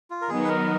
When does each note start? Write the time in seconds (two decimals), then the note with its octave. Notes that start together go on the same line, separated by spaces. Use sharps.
0.10 F4
0.21 A#4
0.29 D#3 F#3 B3 D#4 G#4
0.44 B4
0.48 A#4